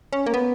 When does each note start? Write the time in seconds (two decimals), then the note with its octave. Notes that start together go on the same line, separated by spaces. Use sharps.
0.13 C#4
0.26 A#3
0.34 B3